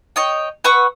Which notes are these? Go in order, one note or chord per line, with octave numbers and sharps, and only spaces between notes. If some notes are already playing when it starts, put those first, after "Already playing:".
C#5 D#5 G5
B4 F#5 C#6 E6